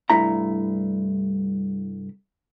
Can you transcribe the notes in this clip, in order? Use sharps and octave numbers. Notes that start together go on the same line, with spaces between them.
C2 G2 A3 E4 A#5